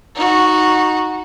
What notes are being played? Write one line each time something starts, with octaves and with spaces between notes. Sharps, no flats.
D#4 F#4